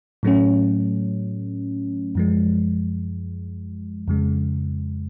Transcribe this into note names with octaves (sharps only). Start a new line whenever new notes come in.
A2 F#3 A3 C#4
F#2 F3 G#3
F2 C#3 G#3